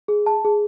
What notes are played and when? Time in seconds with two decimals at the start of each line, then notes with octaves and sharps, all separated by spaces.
0.08 G#4
0.26 A5
0.45 G#4